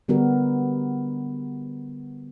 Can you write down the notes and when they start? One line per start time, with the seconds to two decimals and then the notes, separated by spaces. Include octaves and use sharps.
0.08 D3 G3 B3 F#4 A#4